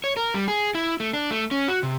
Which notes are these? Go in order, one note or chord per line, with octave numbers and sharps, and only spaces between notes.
C#5
A#4
G3
G#4
E4
A3
D4
A3
C#4
F#4
C3